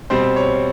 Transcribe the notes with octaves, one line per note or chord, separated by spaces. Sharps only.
B2 G3 C4 C5
C#5